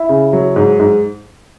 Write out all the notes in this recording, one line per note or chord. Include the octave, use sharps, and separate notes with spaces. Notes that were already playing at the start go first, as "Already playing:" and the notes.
Already playing: E4
C#3
F#3
G#2
G#2